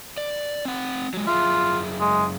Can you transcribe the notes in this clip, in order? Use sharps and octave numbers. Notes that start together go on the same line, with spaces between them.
D5
C4 F#5
F#3 G#3
F#2 F4 G#4 E5
G#3